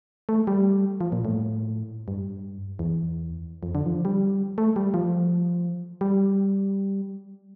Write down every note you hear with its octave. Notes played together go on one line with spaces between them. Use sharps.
A3
G3
F3
A#2
A2
G2
E2
F2
D3
F3
G3
A3
G3
F3
G3